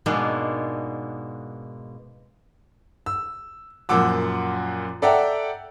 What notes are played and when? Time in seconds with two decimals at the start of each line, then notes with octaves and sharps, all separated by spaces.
0.06 G#2 B2 G#3 A#3 B3 D4
3.06 E6
3.89 F#2 A#2 F3 F#5 D6 E6
5.02 A4 D5 E5 F#5 G5 A#5